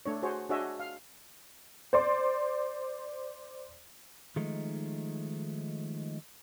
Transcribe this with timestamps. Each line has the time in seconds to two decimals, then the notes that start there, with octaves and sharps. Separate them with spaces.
0.06 A3 D4 C#5
0.23 F#4 G#4 C5 C#5
0.49 D4 F#4 G#4 C#5 D#5 E5
0.80 F5
1.93 C5 D5 C6
4.36 D#3 F3 G#3 A3 D#4